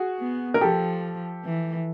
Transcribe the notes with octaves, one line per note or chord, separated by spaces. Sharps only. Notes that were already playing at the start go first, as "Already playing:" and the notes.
Already playing: F#4 G#4
B3
A#4
F3 G4 A4
E3